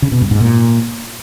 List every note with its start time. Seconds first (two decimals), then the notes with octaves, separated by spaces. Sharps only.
0.02 C#3
0.12 B2
0.21 G2
0.31 G#2
0.41 A#2